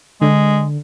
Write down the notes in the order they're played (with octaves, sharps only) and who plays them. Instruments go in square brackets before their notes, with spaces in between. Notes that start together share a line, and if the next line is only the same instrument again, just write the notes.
[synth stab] D3 [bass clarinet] G#3